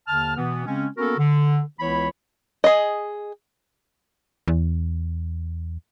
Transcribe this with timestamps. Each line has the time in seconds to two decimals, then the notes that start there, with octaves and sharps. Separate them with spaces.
0.07 D#2 D3 A5 F6
0.37 B2 E3 B3
0.65 C#3 G#3 C4 C#4
0.97 A#3 B3 C#4 F#4 A4 A#4
1.17 D3
1.79 C#2 E3 B3 E4 C#5 B5
2.64 G#4 D#5
4.48 E2